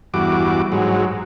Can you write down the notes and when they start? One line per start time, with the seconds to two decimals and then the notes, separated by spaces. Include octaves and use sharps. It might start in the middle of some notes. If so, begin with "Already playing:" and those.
0.14 E2 G2 F#4 D6
0.72 G#2 F#3